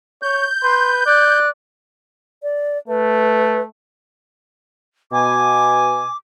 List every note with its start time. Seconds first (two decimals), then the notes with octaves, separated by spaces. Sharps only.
0.22 C#5 G6
0.63 B4 C6
1.06 D5 F#6
2.43 D5
2.88 A3 B4
5.12 B2 G#5 D6